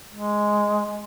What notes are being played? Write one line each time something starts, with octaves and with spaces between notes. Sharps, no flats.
G#3